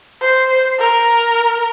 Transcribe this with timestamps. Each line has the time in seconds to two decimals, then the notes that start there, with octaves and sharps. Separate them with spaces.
0.21 C5
0.79 A#4